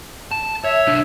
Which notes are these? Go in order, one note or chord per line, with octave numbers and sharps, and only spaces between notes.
A5
C#5 E5
C2 D4